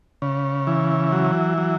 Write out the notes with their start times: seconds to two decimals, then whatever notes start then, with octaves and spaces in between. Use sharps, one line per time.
0.22 C#3
0.67 E3
1.12 F#3
1.58 F#3